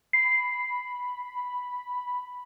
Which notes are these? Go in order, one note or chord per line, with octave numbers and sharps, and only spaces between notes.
B5 C7